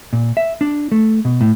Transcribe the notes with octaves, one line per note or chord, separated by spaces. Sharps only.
A#2
E5
D4
A3
B2
A2